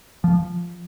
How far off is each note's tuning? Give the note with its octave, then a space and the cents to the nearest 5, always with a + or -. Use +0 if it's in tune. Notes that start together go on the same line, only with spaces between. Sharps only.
F3 -5